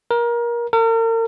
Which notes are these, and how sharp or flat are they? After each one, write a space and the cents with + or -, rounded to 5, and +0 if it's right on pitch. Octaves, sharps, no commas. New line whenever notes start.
A#4 +25
A#4 -40